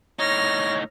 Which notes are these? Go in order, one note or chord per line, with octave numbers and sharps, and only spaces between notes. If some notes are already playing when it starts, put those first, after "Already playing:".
A2 D#4 C#5 F6 A#6